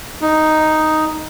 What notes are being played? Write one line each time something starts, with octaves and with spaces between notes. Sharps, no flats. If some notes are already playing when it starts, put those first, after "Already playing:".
D#4